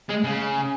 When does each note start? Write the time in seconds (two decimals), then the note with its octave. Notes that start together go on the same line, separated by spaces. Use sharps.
0.09 G#3
0.24 C#3